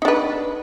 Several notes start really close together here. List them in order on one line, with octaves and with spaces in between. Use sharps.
D#4 D4 B4